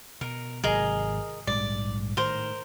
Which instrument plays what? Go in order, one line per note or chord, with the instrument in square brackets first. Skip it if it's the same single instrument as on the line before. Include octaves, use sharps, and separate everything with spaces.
[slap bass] B2 [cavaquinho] A#4
[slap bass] G#1 C3 F#3 [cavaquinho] G#4 A#4 D#5
[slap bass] A#1 G#2 G3 [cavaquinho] D5
[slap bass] A2 D#3 [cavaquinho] A#4 C5